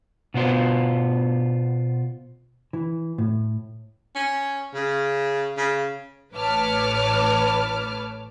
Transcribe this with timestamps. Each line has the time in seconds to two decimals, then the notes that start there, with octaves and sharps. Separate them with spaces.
0.34 B2 B3 F4 C5
2.73 E3
3.18 A2
4.16 C#4
4.74 C#3
5.58 C#3
6.33 A1 B4 C#5 A5 D6 F6